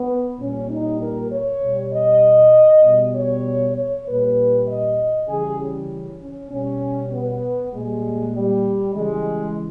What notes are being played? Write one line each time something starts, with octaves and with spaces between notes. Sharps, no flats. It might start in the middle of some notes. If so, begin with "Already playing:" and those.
Already playing: B3
A#2 G3 C#4
D#4
A#4
C#5
B2 G3
D#5
B2 G3
C#5
C#5
A#2 G3 B4
D#5
C#3 E3 G3 G#4
C#4
C#4
B2 G3 C#4
B3
A#2 G3 G#3
G3
C#3 E3 G3 G#3